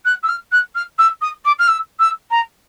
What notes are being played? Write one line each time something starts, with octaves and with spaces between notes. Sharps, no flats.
F#6
E6
F6
F#6
F6
E6
D#6
D6
F6
E6
E6
A#5